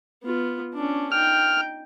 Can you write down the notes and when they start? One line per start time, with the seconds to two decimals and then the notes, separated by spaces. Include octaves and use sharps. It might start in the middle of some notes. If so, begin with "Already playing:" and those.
0.24 B3 F4
0.74 C#4 D4
1.12 D#4 G5 F6